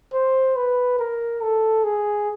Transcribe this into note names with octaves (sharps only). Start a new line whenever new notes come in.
C5
B4
A#4
A4
G#4